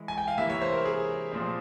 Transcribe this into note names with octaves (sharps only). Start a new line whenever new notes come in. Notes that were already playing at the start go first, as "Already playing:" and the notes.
Already playing: E3 G#3 E4
G#5
G5
F5
C3 E3 A#3 E5
C#5
C5
A#4
G#4
A#2 F3 C4